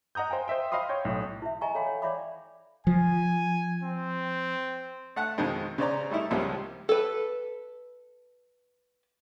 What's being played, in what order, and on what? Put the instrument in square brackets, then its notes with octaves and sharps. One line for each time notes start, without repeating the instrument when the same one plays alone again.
[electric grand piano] D#5 F#5 A#5 D#6 G6
C5 F5 G5 G#5
C5 D#5 E5 G5
D#5 F5 B5 C6 D#6
C#5 G5 G6
B1 A2
[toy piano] E4 E5
D#5 E5 G#5 A#5 C#6
A4 C#5 F5 G5 G#5 B5
C#5
C#5 D5 E5 B5 D6
[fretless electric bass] F3 [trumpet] G#5
[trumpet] C4
[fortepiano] A3 F#5 A5 F#6
F2 B2 D#3 F3 G#3
C#3 C5 D5 A#5
G3 A3 D#4 E4
C#2 F3 G3 G#3 A#3 C#4
[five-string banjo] A4 B4